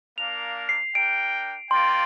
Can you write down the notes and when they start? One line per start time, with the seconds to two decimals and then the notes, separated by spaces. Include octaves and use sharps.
0.18 A#3 D4 A#4 F5 F7
0.69 C7
0.95 D4 A#4 G5 D7
1.71 A#3 F4 D5 G5 C6